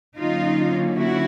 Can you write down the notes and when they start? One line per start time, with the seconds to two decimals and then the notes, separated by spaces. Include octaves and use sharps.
0.17 D3 F#3 A#3 C#4 D#4 F4
0.97 E4 F#4